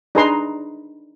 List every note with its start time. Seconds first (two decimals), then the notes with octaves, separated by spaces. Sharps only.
0.15 D4 D#4 G#4 B4 A#5 C6